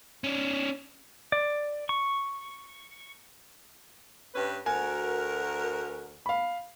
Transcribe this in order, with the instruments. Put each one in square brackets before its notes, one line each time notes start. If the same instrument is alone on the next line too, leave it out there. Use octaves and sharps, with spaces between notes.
[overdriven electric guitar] C#4 D4
[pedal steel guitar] D5
C#6
[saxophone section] G2 C#4 B4
[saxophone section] D2 F#4 A#4 [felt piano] G#5
[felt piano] F5 B5